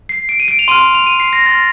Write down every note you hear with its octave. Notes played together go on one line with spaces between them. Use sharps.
C7
D7
D#7
D7
F7
C6 F6 D#7
F7
D#7
C7
A#6
C6 F6 A6